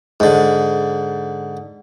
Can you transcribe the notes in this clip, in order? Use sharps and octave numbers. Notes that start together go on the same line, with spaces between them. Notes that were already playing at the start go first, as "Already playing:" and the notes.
G#2 D3